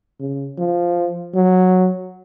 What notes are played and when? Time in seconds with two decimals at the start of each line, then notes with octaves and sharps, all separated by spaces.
0.20 C#3
0.58 F3
1.35 F#3